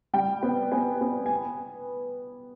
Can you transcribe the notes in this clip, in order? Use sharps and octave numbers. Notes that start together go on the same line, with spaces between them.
G3 G5
B3
B3 G#5
B3
G#5